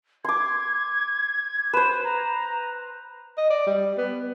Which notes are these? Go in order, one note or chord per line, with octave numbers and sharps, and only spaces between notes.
C6 D6 G#6
B4 C5 E7
A#5
D#5
D5
G3
B3